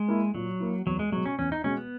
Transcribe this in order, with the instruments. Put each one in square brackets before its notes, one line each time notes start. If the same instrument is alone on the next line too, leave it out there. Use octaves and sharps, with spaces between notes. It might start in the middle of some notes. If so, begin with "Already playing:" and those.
Already playing: [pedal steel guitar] G#3
[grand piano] A#3 E4
[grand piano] A#2 [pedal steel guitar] F#3
[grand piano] A#3 E4
[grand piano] E2 [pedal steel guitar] F#3
[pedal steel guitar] G#3
[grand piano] B2 G#3 [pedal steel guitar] F#3
[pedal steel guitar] C#4
[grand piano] E2 [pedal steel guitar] C#4
[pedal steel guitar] D#4
[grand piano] B2 G#3 [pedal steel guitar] C#4
[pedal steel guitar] B3